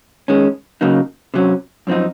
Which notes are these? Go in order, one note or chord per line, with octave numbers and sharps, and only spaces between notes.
D#3 G#3 C#4
C#3 F#3 A#3 D#4
C3 F#3 C#4
F#2 F3 C4 D#4